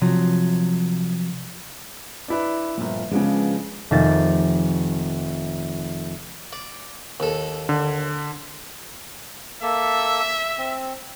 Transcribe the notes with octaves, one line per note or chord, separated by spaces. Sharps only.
C3 F3 F#3
D4 E4 B4
G1 A#2 F3
C#3 F3 G#3 B3 D4
F1 D#3 A#3 D#4 A6
D5
D#2 A4
D3
A#3 A4 E5
C4